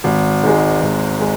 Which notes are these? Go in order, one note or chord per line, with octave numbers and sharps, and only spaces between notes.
G#1
G#2 G#3
G#1
G#3